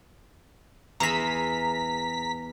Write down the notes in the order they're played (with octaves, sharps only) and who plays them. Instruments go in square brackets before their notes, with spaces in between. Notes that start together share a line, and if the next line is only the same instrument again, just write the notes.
[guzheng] E2 G#4 E5 [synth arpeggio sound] A#5 B6